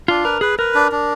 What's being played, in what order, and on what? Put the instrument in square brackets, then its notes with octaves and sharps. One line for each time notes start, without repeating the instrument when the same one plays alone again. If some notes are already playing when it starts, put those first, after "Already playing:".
[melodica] D4 [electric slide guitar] F4
[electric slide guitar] A#4 [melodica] B4
[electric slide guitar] G#4 [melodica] B4
[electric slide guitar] A#4 [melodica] B4
[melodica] D4
D4